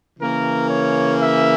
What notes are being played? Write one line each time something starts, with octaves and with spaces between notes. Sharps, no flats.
C#3 E3 A#3 A#4
C#5
E5